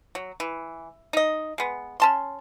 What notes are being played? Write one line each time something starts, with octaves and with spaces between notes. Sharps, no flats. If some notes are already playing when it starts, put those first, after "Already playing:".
F#3
E3
D#4 D#5
G#3 B3
C#4 A5 C6